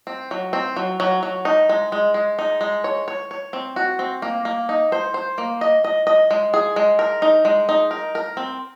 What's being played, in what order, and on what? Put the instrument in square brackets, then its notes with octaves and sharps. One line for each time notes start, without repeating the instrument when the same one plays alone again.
[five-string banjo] C4
F#3
C4
F#3
F#3
F#3
D#4
G#3
G#3
G#3
D#4
G#3
C#5
C#5
C#5
C4
F#4
C4
A#3
A#3
D#4
C5
C5
A#3
D#5
D#5
D#5
G#3
G#4
G#3
A#4
D#4
G#3
D#4
A#4
A#4
C4